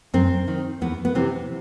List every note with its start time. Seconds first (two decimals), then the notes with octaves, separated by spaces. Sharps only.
0.14 F#2 C4
0.48 D#3
0.81 E2 B3
1.05 B3
1.15 C3 E3 C4